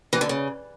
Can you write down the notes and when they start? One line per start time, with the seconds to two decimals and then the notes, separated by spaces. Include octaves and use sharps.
0.13 E3
0.21 D3
0.29 C#3